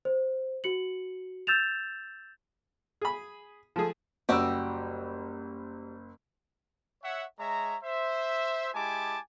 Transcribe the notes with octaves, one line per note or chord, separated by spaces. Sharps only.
C5
F#4 C#7 F#7
E6 G6 A6 E7 F7
G#4 B5
F3 A3 G#4
F#1 G3 F#4 G4 E6
C#5 E5 F#5
G#3 C#5 E5 A#5
C5 E5
G#3 E4 G4 G#5 A5 D6